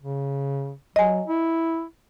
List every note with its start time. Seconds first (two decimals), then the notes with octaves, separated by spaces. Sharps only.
0.02 C#3
0.96 F#3 D#5 G#5
1.27 E4